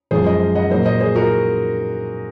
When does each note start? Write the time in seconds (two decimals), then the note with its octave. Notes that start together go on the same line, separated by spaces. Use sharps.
0.11 F#2 F3 G#3 G#4 C5
0.26 C5 D#5
0.55 D#5 F#5
0.70 A#2 F#3 A#3 C5 D#5
0.86 C5 D#5
1.00 G#4 C5
1.15 F#4 A#4